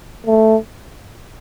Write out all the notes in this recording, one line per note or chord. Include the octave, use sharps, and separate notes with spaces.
A3